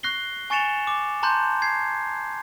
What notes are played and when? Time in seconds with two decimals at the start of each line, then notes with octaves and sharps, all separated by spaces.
0.03 C#6 F#6 A#6 C7 G7
0.50 G#5 C#6 A6 C#7 E7 F7
0.87 D6
1.23 A5 A#5 C6 F#6 G6
1.62 G#6 C7